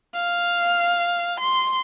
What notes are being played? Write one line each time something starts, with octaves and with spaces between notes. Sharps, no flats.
F5
C6